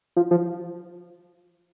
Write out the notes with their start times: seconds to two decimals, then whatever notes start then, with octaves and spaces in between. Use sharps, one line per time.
0.16 F3
0.31 F3